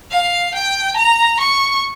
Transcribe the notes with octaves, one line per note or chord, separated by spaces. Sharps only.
F5
G5
A#5
C#6